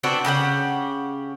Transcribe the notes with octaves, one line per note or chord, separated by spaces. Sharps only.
B3 C4 D4 F#4
C#3 G4 A4 F#5